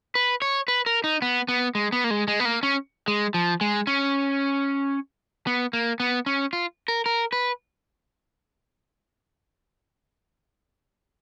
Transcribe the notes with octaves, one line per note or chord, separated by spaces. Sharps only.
B4
C#5
B4
A#4
D#4
B3
B3
G#3
B3
A#3
G#3
G#3
B3
A#3
C#4
G#3
F3
G#3
C#4
B3
A#3
B3
C#4
F4
A#4
A#4
B4